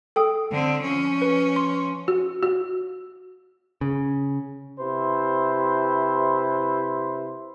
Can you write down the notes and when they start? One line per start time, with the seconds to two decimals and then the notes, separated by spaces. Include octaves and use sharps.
0.16 A4 G5 D#6
0.51 D3 C4
0.82 F3 C#4
1.22 B4
1.56 C6
2.08 F#4
2.43 F#4
3.81 C#3
4.79 C3 E4 B4 C5